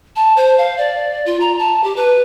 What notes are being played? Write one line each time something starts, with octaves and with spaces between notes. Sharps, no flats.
A5
C5
F5
D5
F4
A#5
A5
G4
B4